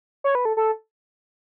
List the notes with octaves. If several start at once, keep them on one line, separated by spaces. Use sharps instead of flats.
C#5
B4
A4
A4